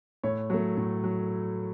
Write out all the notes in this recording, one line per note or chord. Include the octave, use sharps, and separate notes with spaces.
A2 C#5
F#3 A3 C#5
A2
F#3